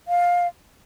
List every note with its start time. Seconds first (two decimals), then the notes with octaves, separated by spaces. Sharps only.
0.08 F5